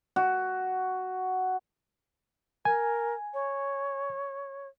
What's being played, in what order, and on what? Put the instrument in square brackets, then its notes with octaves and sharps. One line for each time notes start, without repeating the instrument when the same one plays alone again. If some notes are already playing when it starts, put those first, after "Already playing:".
[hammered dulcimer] F#4
[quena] A#4 [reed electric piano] G#5
[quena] C#5